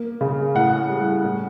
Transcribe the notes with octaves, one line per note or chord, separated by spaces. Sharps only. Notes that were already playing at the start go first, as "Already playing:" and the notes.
Already playing: A#3
C#3
A2 F#5
G3
A2